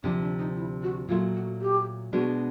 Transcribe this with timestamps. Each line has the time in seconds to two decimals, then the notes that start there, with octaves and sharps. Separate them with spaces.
0.03 D2 C3 F3 D4
0.21 D4
0.38 D#4
0.55 E4
0.82 F#4
1.08 A#2 F#3 A3 F4
1.34 F#4
1.61 G4
2.13 B2 G#3 B3 D4 F#4